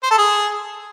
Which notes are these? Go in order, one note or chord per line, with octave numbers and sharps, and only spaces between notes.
C5
A4
G#4